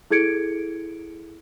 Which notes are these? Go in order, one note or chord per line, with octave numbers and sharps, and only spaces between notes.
E4 G#4 A4 G#6 C#7 D7